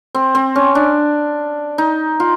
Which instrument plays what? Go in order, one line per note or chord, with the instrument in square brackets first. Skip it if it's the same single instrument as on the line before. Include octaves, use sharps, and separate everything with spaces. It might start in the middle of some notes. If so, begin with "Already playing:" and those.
[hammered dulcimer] C4
C4
C#4
D4
D#4
F4